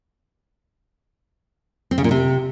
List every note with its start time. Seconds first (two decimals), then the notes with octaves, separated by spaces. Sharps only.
1.91 C4
1.98 C#3
2.04 A#2
2.11 C3